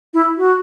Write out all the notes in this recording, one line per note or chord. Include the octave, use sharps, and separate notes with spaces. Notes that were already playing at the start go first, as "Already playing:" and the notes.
E4
F#4